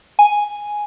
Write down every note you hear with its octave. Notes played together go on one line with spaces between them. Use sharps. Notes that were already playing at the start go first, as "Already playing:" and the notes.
G#5